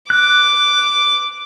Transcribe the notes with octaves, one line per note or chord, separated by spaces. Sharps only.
D6 F#6